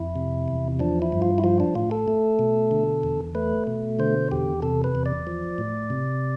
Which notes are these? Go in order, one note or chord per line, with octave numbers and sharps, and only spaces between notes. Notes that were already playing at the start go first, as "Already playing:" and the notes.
Already playing: F2 E4
C3
E2
F3 D4
E4
G2
F4
E4
F3 F4
D4
A2 F4
A4
A3
B2
D3
E2
A3 B4
B2
D3 C5
E2 G4
C3 A4
B4
E2
D5
F3
A2
C3